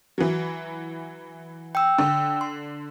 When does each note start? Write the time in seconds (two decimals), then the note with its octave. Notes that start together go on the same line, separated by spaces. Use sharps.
0.18 E3 F#3
1.75 G5 E6
1.98 D3
2.41 C6